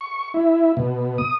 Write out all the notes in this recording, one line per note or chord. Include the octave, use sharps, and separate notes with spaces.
C#6
E4
B2
D#6